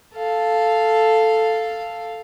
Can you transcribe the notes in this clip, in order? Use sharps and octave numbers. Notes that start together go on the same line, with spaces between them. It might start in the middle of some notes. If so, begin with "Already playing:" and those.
A4 F5